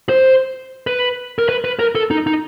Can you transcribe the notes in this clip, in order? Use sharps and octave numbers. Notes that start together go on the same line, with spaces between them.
C5
B4
A#4
B4
B4
A#4
A4
D#4
D#4